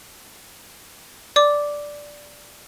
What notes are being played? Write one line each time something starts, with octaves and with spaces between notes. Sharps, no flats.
D5 D6